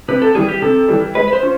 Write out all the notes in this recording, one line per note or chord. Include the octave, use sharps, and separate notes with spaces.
C3 B4
A4
E3 G3 G#4
G4
C3 A4
E3 G3
G#3 B4
B4
C5
C#4 F4